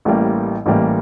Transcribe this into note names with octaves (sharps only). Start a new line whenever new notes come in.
A1 A2 E3 G3 A#3
A1 A2 E3 G3 A#3